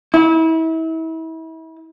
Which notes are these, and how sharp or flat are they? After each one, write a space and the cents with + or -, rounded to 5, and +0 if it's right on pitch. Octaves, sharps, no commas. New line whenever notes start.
E4 -35